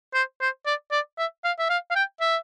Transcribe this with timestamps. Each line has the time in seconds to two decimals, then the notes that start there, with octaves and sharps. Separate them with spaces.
0.14 C5
0.41 C5
0.66 D5
0.92 D5
1.18 E5
1.44 F5
1.59 E5
1.70 F5
1.90 F5
1.95 G5
2.21 E5